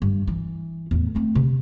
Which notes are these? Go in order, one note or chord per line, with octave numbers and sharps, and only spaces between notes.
G2
E3
E2 A2
A3 C4
C3